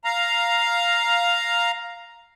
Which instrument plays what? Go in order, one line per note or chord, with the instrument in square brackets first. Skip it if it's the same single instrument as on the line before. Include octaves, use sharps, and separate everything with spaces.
[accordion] F5 A#5